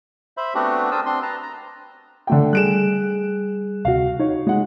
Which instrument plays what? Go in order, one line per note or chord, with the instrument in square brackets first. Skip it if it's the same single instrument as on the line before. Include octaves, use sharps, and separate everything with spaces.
[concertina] C5 E5 B5
A3 B3 C4 D4 F#4 G4
D4 A#4 C5 A5 D#6 E6
C4 D4 C6
B4 A5 A#5
A#5
[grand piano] D3 A3 G5
[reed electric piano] G3 G#4 [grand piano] F#6 D7 E7
[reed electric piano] D2 C3 F#4 [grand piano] F5
[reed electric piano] D#4 [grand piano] C#5
[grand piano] G#3 F#5